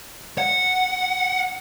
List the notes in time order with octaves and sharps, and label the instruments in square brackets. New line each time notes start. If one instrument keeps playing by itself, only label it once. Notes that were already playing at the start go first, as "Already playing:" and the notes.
[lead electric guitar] F#5